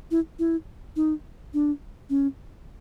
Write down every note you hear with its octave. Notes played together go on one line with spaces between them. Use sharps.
E4
E4
D#4
D4
C#4